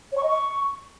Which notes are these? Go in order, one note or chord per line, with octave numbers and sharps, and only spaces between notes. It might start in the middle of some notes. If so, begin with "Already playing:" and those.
C#5
C#6
D#5
C#6